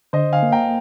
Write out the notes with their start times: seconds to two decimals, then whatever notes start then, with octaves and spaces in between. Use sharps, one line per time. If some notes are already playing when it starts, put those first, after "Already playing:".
0.13 D3 C5 D#5
0.33 F5 G#5
0.43 A#3
0.52 G5 A#5